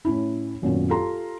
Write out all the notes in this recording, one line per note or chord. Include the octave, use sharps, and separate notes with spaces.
A2 C#4 E4
G#1 F#2 A#2 B3 C#4
F4 G4 A4 A#5 C6